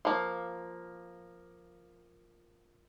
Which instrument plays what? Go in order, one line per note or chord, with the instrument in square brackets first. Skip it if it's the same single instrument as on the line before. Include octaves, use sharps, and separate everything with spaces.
[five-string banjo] F3 A#3